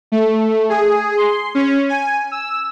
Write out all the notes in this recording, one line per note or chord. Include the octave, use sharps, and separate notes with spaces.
A3
G#4
C6
C#4
G#5
E6